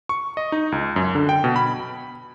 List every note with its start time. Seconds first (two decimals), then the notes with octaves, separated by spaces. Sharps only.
0.09 C#6
0.37 D#5
0.52 D#4
0.72 C#2
0.96 F#2
1.15 D3
1.29 G5
1.44 B2
1.56 B5